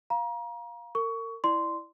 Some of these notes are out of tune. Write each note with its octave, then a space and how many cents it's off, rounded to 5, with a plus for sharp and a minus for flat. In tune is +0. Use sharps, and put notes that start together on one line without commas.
F5 +5 A#5 +30
A#4 -35 C#6 +20
E4 +0 D5 +10 C6 -10